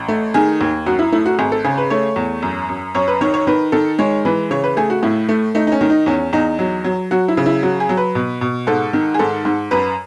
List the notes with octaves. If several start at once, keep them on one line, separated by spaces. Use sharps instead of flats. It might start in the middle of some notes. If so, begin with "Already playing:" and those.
Already playing: A1
A3
D#3 G#4
D#2
F#2 F#4
E4
A3 E4
F#4
G#1 G#4
A4
C#3 G#4
B4
A3 C#5
E2
F#2
F#2
F#2 C#5
B4
D#3 C#5
C#5
D#3 B4
D#3 A4
G#3 C#5
E3 B4
C#3 C#5
B4
A3 G#4
F#4
A2 E4
A3
A3 D#4
D#4
C#4
D#3
D#4
E2 C#4
E2 D#4
F#3
F#3
F#3 F#4
E4
C#3
E4
F#3 F#4
G#4
F#3
B4
B2
B2
G#2 A4
D#3
G#4
G#2 A4
G#2
F#2 B4